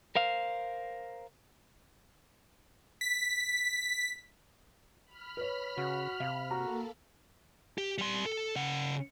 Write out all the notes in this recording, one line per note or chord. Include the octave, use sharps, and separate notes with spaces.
A#4 C5 F5
B6
B5 F6
B4 C#5
C#3 F#4
C3 F5
A#3 F#4 A4 A#5
G4
G3 C6
A4
C#3 F#5